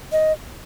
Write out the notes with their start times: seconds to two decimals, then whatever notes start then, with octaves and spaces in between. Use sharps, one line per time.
0.12 D#5